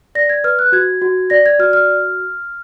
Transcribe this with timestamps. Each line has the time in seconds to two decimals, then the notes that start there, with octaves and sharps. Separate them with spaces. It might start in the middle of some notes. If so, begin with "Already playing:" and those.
0.15 D5 A#6
0.29 G#6
0.44 B4 F6
0.59 F#6
0.72 F#4 G#6
1.02 F#4
1.30 D5 A#6
1.46 G#6
1.59 F#4 F6
1.73 F6